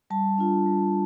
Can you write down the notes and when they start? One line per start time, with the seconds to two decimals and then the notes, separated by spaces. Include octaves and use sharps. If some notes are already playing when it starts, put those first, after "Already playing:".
0.10 G3 A5
0.38 D4 F4
0.66 G3